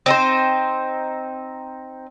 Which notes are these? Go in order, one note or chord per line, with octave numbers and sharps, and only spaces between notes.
C4 D#4 C5